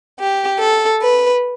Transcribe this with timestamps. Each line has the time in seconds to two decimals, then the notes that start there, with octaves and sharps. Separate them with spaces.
0.18 G4
0.60 A4
1.01 B4